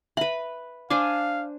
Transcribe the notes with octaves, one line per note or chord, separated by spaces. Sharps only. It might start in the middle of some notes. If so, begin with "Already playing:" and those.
B4 E5 B5
D4 C5 F5 G#5 D6